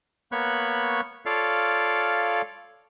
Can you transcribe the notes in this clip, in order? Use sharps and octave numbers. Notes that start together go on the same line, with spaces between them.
A#3 B3 C#5 B5 C#6 F#6
F4 A4 C#5 D5 F5